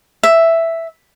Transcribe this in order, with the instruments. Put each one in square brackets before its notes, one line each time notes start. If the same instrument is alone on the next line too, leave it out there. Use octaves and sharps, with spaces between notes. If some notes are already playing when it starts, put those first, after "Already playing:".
[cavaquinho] E5